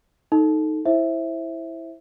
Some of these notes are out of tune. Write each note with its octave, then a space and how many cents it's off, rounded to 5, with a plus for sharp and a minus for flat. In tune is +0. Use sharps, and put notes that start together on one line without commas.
D#4 +0 A4 +0
E4 +0 C5 +15 E5 +0